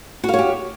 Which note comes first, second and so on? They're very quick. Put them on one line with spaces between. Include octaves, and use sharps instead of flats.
F#4 F5 C#5 G4